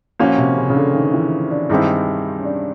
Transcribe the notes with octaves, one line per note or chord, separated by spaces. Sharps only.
A#2 F3 A#3 C#4 F#4
C3
C#3
C#3
D3
D#3
E3
D4
G2 D#3 G#3 C4 D#4 E4
C#4
D4